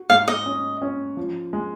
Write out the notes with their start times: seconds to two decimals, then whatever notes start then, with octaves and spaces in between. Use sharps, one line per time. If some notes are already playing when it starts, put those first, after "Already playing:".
Already playing: F#4
0.10 G#2 F5
0.28 D#5
0.46 C#4
0.82 C#4
1.17 F3
1.53 G#3